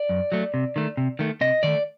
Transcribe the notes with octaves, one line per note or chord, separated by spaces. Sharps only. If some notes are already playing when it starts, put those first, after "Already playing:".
Already playing: D5
F#2
F#3 A3
C3
D#3 A3
C3
D#3 A3
C3 D#5
D#3 A3 D5